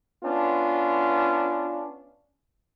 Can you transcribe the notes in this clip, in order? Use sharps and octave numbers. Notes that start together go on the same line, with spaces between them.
B3 C#4 D4 F4